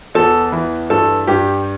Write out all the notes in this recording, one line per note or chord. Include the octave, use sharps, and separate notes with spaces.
E2 A4
E3
G2 A4
G2 G4